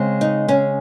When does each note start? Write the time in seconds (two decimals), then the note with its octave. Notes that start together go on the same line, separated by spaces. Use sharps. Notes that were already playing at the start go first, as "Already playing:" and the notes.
Already playing: C#3 G#3 C4
0.21 D#4
0.48 C#4